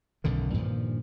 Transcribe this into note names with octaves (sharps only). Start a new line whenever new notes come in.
B1 F#2 D3 D#3
G2 A#2 D#3 F3